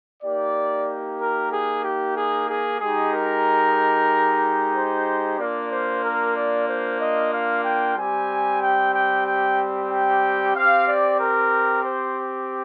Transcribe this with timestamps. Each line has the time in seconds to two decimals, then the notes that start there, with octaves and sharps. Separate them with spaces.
0.23 A#3 D#4 G4 D5
1.20 A#4
1.52 G#4
1.84 G4
2.16 G#4
2.49 G#4
2.81 G#3 D#4 G4 G#4
3.13 A#4
4.74 C5
5.39 A#3 D4 F4 D5
5.71 C5
6.04 A#4
6.35 D5
6.68 C5
7.00 D#5
7.32 F5
7.64 G5
7.97 G3 C4 G4 G#5
8.61 G5
8.94 G5
9.26 G5
9.90 G5
10.55 C4 G4 F5
10.87 D5
11.19 A#4
11.84 C5